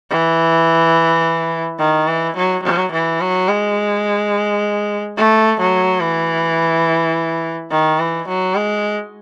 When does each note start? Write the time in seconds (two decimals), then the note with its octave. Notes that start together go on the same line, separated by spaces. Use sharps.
0.10 E3
1.79 D#3
2.07 E3
2.36 F#3
2.63 F#3
2.92 E3
3.21 F#3
3.48 G#3
5.17 A3
5.60 F#3
6.01 E3
7.71 D#3
8.00 E3
8.28 F#3
8.55 G#3